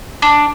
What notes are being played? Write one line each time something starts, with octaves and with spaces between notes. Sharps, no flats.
D4